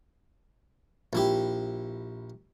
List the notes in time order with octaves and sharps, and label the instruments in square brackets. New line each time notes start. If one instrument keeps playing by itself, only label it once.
[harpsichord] A#1 E4 G4